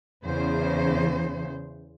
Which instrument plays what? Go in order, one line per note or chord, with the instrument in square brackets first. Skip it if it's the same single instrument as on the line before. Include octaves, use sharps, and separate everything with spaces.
[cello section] E2 C#3 C5